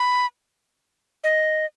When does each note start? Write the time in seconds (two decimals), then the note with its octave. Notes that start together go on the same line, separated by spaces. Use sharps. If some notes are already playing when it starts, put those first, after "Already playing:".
Already playing: B5
1.24 D#5